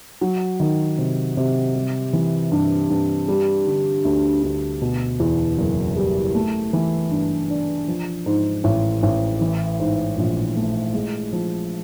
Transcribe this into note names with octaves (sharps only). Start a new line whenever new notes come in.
F#3
D#3
C3
C3
G3
E3
G2
G2
G3
D3
D2
D2
B2
E2
F#1
G3
A3
E3
G2
D4
F3
G#2
A1
A1
E3
G#2
A#1
A3
G#3
F3